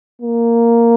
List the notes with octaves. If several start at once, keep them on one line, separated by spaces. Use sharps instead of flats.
A#3